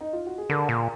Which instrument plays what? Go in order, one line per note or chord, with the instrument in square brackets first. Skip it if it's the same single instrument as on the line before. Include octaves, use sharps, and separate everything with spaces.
[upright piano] D#4
F4
F#4
G#4
[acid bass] D3 [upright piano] A#4
[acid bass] A#2